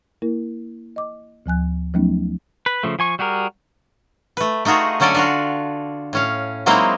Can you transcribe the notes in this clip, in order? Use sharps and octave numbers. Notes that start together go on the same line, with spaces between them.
A#3 E4 A#4
D#5 D6
D2 F3 G#5 F#6
F3 F#3 A3 B3 C#4 D#4
B4
C#3 F3 A3
F3 G#5 C#6
G3 F#4 G#4 A#4
A3 B4
A3 D#4 F4 F#4 G#4
D3 F#3 C#4 A4 D5 G#5
D4 F4 F#4
A2 C#4 F5
F#3 G#3 A#3 C4 D#4 E4